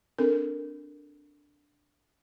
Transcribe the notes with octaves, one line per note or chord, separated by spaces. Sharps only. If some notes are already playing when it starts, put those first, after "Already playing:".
C4 D4 A4 A#4